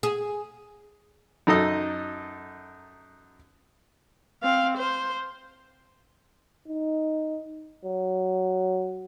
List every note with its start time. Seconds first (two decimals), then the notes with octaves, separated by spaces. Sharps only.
0.03 G#4
1.47 F#2 D#4 A4 D#5 D#6
4.43 C4 F5
4.77 C5
6.68 D#4
7.85 F#3